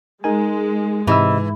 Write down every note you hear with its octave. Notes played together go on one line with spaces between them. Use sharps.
G#3 D#4 A#4 G#5
G#2 C3 E3 D#5 E6